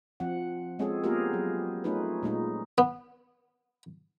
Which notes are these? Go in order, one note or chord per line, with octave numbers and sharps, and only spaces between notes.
F3 C4 F#5
G#3 C4 C#4 F4 G#4 A4
A#3 B3 F4 G4 G#4 A#4
F#3
A3 C#4 D#4 F4 B4
A#2 G#3 D#4 F4
B3